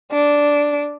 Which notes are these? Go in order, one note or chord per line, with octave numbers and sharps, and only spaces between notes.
D4